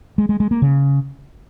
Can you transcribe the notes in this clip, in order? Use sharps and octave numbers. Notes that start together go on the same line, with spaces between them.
G#3
G#3
G#3
A#3
C#3